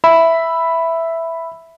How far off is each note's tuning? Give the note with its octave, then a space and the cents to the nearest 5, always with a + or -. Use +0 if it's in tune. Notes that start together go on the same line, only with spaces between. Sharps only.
E5 +0 B5 +0